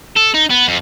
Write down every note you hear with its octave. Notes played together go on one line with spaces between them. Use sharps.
A4
D#4
B3
F2